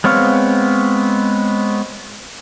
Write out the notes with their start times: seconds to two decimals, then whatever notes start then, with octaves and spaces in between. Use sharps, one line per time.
0.04 G#3 B3 C4 C#5 F5